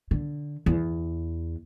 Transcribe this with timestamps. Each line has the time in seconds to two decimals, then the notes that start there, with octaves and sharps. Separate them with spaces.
0.11 D3
0.66 E2